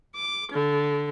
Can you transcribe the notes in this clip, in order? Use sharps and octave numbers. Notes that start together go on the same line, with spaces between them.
D6
D3